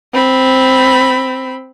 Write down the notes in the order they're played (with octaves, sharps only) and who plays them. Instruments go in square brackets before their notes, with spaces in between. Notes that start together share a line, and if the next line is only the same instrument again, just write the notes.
[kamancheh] C4 B5